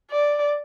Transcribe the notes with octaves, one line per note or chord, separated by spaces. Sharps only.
D5